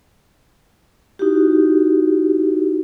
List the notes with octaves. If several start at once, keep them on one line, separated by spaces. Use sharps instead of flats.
D#4 E4 F#4 G4